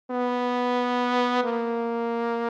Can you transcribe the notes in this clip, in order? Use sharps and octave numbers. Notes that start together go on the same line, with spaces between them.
B3
A#3